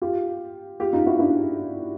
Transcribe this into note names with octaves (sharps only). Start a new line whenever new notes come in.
F4 G4
F4 G4
D#4 F4
E4 F#4
D4 E4